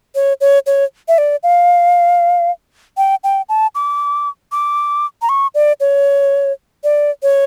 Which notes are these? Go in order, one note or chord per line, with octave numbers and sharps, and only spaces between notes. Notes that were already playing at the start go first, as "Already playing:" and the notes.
C#5
C#5
C#5
E5
D5
F5
G5
G5
A5
D6
D6
A#5
C#6
D5
C#5
D5
C#5